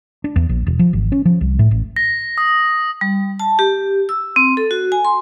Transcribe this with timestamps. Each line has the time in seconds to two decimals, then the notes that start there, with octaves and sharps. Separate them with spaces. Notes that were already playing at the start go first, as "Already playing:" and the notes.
0.24 D4
0.36 E2
0.49 A#1
0.66 E1
0.79 F3
0.93 G#1
1.12 C#4
1.25 F3
1.41 C2
1.59 A2
1.71 A1
1.96 A#6
2.38 D#6
3.01 G3
3.39 A5
3.59 G4
4.09 E6
4.36 C4
4.57 A4
4.71 F#4
4.92 G#5
5.05 C6